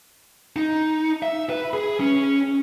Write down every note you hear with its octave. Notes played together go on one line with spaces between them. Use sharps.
D#4
E5
B4
G#4
C#4